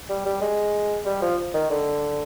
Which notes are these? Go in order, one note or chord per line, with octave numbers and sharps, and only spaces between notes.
G3
G3
G#3
G3
F3
D#3
D3